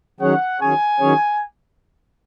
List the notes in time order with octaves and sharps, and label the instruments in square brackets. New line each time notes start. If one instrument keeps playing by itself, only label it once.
[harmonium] D#3 F#3 C#4 G#4 C#5 [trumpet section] F#5
[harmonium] D#3 F#3 C#4 G#4 C#5 [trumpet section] G#5
[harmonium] D#3 F#3 C#4 G#4 C#5